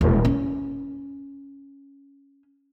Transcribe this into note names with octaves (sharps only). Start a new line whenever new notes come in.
D#1
C#4